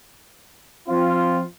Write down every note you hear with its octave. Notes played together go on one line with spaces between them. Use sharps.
F3 C4 F4